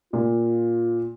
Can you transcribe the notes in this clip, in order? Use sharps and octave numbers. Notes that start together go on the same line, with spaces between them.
A#2 F4